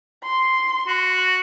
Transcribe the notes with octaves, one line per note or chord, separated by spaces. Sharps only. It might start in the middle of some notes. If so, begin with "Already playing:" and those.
C6
F#4